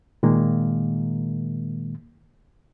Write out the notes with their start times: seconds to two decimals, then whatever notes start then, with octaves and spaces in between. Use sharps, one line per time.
0.23 A#2 D#3 G#3 A#3